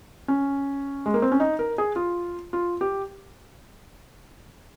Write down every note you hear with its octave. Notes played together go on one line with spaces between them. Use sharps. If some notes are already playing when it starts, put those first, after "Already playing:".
C#4
G#3
A#3
C4
C#4
D#4
A#4
G#4
F4
F4
G4